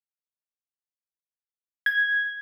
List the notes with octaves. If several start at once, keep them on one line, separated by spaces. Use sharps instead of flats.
G#6